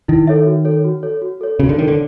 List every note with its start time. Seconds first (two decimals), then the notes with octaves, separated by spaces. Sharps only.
0.08 D#3 E4
0.27 A4 C#5 E5
0.46 F#4
0.65 A4 C#5
0.84 F#4
1.03 A4 C#5
1.22 F#4
1.41 A4 C#5
1.60 C#3 F#4
1.69 D3
1.78 D#3 A4 C#5
1.88 D3